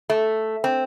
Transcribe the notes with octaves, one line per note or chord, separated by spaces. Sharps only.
A3
C4